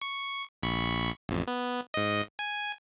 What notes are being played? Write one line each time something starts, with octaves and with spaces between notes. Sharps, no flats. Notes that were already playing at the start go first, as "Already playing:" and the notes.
C#6
A#1 B5 C#6
A1 F2
B3
G#2 D#5
G#5